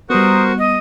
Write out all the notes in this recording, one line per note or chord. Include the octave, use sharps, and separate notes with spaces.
G3 B3 F#4 A#4 C5 D#6
D#5